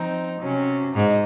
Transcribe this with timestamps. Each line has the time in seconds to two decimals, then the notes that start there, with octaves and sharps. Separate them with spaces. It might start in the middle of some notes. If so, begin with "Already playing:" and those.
Already playing: F3 C4 D#4
0.38 C3 F#3 C#4
0.95 G#2 D#4